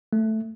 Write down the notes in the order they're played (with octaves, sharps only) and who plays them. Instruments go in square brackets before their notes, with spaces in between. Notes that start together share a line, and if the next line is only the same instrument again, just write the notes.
[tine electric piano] A3